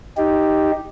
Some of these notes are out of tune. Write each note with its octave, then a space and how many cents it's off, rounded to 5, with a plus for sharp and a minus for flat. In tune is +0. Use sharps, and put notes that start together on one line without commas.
D#4 +0 G4 +0